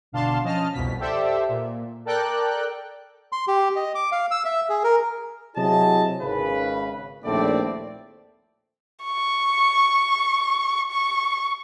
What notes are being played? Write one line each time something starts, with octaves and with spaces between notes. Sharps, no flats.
G1 B2 D4 F5 A5 C6
F3 C#4 D#5 A5 F6
C2 F2 B2 B6
G4 A4 C5 D5 E5
A#2
A4 A#4 D5 G5 F#6
C6
G4
D#5
D6
F5
E6
E5
G#4
A#4
C3 F#3 E4 G#4 D#5 A5
G#1 C#3 B4
A#1 D#2 A2 A3 C4 D5
C#6
C#6